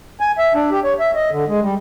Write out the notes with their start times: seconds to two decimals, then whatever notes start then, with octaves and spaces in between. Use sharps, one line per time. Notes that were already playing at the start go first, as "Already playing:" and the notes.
0.21 G#5
0.38 E5
0.54 D4
0.71 G4
0.84 C#5
1.00 E5
1.15 D#5
1.31 D3
1.48 G#3
1.62 G3